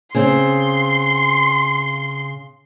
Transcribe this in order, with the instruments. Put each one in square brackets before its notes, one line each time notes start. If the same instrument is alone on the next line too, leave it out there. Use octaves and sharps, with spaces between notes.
[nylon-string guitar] C#3 C4 [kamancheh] C6